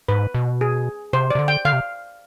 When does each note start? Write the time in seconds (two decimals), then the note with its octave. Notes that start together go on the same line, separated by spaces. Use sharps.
0.08 G#2 B4
0.34 B2
0.61 G#4
1.13 C3 C5
1.30 D5
1.35 C3
1.39 D3
1.48 G5
1.65 D3 F5
1.73 C3